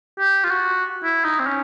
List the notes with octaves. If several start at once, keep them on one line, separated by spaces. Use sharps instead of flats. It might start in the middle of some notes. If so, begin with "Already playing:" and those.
G4
F4
F#4
E4
D#4
C4
C#4